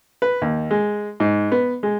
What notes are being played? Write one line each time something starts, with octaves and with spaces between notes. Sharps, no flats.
B4
D#2
G#3
G#2
B3
G#3